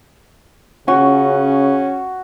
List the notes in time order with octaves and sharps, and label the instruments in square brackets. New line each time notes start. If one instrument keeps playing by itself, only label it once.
[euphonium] C#3 [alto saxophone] C#4 [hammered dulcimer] F#4